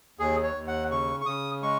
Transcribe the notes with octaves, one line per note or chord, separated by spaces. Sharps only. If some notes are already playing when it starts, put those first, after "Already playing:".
D#2 G#4
C#5
D#2
F#5
C#3 C#6
C#6
C#3 D#6
G#3 C#6